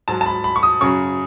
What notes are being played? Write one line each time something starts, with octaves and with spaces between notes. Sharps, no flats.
G#2 F#3 A5
A5
B5
B5
C#6
D#6
F#2 C#3 F#3 C#6